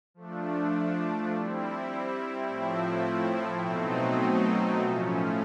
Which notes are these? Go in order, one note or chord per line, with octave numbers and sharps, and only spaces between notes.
F3 A3 D4
G3 C4 E4
A2 F3 A3 C4 E4
B2 F#3 A3 C4 D#4
A2 F3 A3 C#4